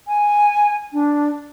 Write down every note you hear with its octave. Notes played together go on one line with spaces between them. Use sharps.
G#5
D4